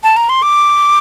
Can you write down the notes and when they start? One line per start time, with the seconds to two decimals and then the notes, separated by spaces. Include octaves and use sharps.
0.03 A5
0.17 A#5
0.29 C6
0.42 D6